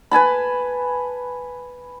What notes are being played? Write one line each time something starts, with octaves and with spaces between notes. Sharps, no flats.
B4 G#5 A5 B5